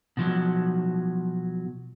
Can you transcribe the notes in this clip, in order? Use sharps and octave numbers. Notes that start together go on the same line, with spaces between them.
B2 F3 F#3